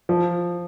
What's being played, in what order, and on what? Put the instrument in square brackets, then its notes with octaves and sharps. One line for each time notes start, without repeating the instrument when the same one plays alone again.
[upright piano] F3